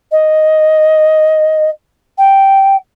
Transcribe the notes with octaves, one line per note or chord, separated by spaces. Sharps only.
D#5
G5